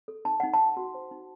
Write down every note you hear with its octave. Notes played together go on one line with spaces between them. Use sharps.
A4
D#4 A5
D#4 F#5
A5
D#4
F#4
C5
D#4